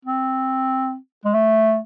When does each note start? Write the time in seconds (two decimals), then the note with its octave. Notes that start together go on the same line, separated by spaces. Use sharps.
0.05 C4
1.25 G#3
1.34 A3